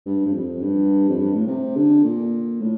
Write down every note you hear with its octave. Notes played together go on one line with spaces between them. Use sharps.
G2
G2
F2
G2
F2
G2
A2
C3
D3
A#2
A2